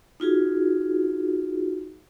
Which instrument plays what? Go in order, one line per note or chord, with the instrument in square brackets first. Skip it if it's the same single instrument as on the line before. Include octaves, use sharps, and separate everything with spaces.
[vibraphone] D#4 F4 F#4 G#4